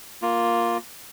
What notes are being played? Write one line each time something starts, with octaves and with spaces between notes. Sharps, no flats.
A#3 F4